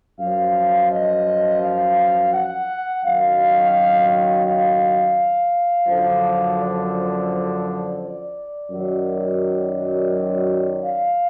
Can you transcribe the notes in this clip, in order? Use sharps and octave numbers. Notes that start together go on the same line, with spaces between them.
F#2 F3 F5
D#5
F5
F#5
F#2 D#3 F#3 F5
F5
F#2 D3 F3
D5
D5
F#2 D#3 F#3
F5